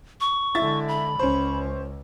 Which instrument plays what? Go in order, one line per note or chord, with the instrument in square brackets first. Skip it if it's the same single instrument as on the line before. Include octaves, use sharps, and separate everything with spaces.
[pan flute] C#6
[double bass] D3 G#3 [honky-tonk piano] E4 E5 A6
[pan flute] B5
[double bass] C#2 [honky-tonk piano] C#4 C5